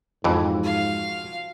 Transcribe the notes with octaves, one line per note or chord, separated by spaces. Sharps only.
F2 G#2 E3 F3 F#4
F5